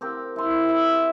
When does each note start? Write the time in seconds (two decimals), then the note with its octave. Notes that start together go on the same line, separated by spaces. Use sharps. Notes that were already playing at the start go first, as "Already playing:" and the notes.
0.01 C4 G4 A#4
0.36 E4 C6
0.69 E5